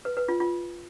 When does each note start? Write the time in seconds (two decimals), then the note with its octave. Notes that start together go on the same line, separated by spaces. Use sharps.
0.05 B4
0.17 B4
0.28 F4
0.40 F4